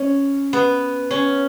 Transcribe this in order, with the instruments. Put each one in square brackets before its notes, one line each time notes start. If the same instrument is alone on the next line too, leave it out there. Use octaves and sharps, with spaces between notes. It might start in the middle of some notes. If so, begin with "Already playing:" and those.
Already playing: [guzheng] C#4
B3
C#4